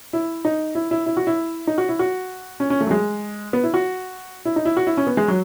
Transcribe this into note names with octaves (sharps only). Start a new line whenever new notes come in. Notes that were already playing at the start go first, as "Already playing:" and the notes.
E4
D#4
E4
E4
E4
F#4
E4
D#4
F#4
E4
F#4
C#4
C#4
A3
F#3
G#3
B3
E4
F#4
E4
D#4
E4
F#4
E4
C#4
B3
G#3
F#3